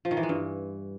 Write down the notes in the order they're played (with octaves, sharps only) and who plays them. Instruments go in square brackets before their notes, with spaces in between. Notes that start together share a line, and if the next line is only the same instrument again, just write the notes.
[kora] F3
D#3
E3
G#3
G2